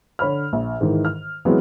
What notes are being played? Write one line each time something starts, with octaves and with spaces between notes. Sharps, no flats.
D3 C#5 B5 F6
A#1
G#2 D#3 E3
F6
E3 F#3 G#3 B3 C4 G#4